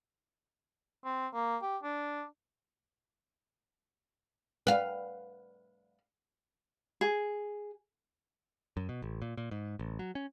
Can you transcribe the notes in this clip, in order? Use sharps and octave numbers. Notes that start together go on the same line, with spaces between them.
C4
A#3
G4
D4
B4 F5
G#4
F#2
B2
A1
A#2
A#2
G#2
A1
F#3
C#4